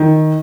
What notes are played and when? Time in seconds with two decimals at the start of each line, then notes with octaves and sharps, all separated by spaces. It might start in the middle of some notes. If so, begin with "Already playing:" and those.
Already playing: D#3